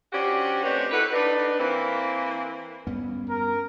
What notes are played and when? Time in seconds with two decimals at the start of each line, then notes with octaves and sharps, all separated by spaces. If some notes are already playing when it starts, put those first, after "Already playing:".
0.12 F3 C#4 D4 F#4 G4
0.63 A3 C4 D4 D#4 B4 C#5
0.91 E4 F#4 A4 B4
1.12 D4 D#4 B4
1.59 E3 A#3 C4
2.87 G2 B3 C#4
3.30 A#4